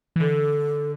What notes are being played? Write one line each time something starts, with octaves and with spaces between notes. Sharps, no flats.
E3
D3 A4